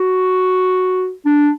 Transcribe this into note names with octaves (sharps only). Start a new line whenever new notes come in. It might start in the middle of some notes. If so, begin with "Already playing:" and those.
Already playing: F#4
D4